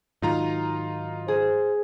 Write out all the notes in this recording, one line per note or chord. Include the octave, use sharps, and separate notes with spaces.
G#2 D#3 F#3 D#4 F4 A#5
G#4 C5